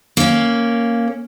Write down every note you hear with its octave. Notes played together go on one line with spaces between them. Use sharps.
A#3 C#4